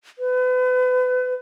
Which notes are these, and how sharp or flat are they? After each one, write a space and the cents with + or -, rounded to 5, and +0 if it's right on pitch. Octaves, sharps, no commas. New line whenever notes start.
B4 +35